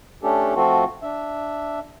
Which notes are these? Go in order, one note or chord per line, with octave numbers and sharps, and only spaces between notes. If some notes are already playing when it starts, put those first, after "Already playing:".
A3 C#4 D4 G4 A4
F3 A3 C4 F4 F#4 A4
D4 E5